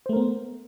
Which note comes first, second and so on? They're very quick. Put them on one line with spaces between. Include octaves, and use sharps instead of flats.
C5 A3 A#4 B3